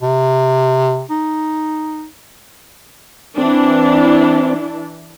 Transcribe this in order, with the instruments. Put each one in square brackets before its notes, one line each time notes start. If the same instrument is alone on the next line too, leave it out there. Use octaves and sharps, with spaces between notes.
[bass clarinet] C3
D#4
[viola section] E3 D4 [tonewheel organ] C4